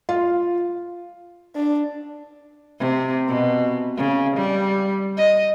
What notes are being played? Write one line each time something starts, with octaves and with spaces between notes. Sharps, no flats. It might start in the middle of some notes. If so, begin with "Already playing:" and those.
F4
D4
C3
B2
C#3
G3
D#5